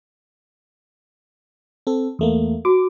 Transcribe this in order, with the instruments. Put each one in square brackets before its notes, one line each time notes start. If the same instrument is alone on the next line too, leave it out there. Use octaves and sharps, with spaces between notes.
[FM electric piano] C4 A4
E2 A3 A#3
[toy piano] F#4 [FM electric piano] D6